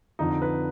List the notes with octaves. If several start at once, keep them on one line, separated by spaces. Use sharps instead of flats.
F2 D3 F3 D#4
B4